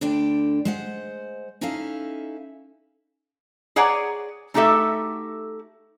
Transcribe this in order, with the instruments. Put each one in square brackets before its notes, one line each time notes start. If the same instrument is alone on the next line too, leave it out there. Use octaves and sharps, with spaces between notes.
[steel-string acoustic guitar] D2 D3 D4 D5 G5
G#3 C5 F#5
C#4 D#4 E4 A4 E5 F5
[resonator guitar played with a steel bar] G#4 B4 C#5 D5 F#5 A#5
A3 D#4 F#4 G4 A4 E5